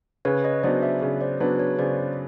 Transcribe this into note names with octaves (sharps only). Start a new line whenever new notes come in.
C#3 B4 C#5
C#5 D#5
F#3 B3 D4 C5 D5
D5 E5
C#3
C5 D5
F#3 B3 D4 B4 C#5
B4 C#5
C#3 C5 D5